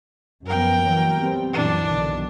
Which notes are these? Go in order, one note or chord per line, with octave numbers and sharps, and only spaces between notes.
F#2 F3 B3 A#4 G5
E3 F#3 A#3
G3 B3 C4
F#2 A#2 E3 D4
B1 D3 D#3